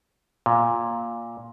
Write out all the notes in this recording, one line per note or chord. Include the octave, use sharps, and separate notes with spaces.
A#2